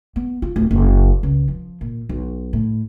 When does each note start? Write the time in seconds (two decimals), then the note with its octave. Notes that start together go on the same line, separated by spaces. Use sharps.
0.16 B3
0.42 F4
0.56 D1
0.71 F#1
1.23 C#2
1.48 F3
1.81 A#2
2.09 B1
2.53 A2